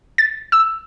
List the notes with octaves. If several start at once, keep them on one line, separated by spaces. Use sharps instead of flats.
A6
E6